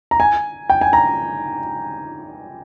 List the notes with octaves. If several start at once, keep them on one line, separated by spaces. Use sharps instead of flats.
A#5
G#5
G5
G#5
A#5